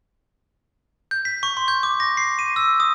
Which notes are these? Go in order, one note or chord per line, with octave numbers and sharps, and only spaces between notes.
G6
B6
C#6
C6
G6
D6
A#6
C7
D#7
E6
D#6